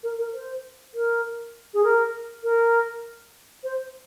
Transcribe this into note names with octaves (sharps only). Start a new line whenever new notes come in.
A#4
A#4
C5
A#4
G#4
A#4
A#4
C5